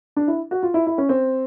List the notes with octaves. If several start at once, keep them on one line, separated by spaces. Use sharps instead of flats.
D4
E4
F#4
F4
E4
E4
C#4
C4